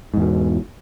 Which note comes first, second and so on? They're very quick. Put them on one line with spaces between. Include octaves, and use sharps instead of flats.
G#2 E2 B2